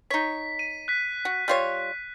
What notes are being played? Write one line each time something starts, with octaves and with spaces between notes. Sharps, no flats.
D#4 C#5 B6
D#7
F#6 B6
F#4
G3 F4 C#5